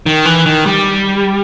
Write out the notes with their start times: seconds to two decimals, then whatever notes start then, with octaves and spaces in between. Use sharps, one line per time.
0.06 D#3
0.25 E3
0.46 D#3
0.66 G3